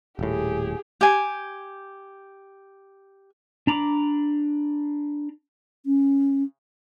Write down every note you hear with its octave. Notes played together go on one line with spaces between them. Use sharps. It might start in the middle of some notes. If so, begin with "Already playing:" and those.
D#1 A2 G4 G#4
G4 G#5
D4 A#5 B5 D6
C#4